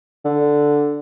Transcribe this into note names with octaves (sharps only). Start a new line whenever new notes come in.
D3